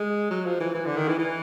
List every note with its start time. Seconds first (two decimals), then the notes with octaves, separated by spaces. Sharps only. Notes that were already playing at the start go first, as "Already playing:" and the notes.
Already playing: G#3
0.31 F#3
0.46 F3
0.60 E3
0.75 E3
0.86 D3
0.97 D#3
1.08 E3
1.19 E3